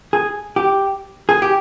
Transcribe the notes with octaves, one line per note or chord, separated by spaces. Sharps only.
G#4
G4
G#4
G4